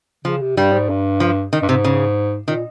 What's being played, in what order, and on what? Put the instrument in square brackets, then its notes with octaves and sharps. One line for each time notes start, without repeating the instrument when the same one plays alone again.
[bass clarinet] C#3 [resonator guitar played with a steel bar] F3
[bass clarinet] C3
[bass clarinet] G2 [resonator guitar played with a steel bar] G3
[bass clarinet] G#2
G2
[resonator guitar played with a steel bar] F3
D#3
[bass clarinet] G2
[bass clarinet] G#2 [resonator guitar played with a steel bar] C3
[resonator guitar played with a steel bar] C#3
[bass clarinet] A#2 [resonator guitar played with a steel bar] D#3